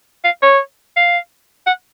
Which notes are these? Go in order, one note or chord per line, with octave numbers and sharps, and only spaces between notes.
F5
C#5
F5
F#5